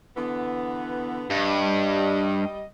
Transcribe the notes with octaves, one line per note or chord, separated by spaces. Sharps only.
D3 E3 B3
G2 G3 D#5